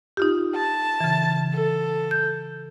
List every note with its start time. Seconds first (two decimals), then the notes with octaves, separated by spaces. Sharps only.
0.17 D#4 F4 G4
0.55 A5
1.01 C#3 E3
1.54 A4
2.11 G6